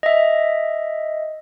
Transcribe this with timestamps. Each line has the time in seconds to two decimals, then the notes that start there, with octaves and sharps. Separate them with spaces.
0.03 D#5 E5